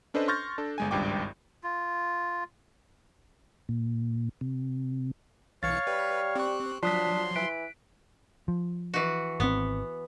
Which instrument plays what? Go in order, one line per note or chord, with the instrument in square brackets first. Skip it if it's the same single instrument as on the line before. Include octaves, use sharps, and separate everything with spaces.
[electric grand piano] C#4 D4 A4 B4 C5 D#5
C6 C#6 F6 G6 A6 A#6
D4 A4
G1 G#3 G#5
G#1 C#2 G2 G5 D6
[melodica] F4
[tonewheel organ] A#2
C3
[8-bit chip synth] B1 E3 C#7 [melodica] C#5 F5 [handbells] A6
[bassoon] G3 [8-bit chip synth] B4
[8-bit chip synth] C4 F#6 [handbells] G4 C#6
[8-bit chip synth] F3 F#3 [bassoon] D4 [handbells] F4 D#6 B6 [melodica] C6
[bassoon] E3 [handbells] F#6 B6 D7
[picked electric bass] F3
[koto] E3 F#4
[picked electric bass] G#1 C4 [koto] B3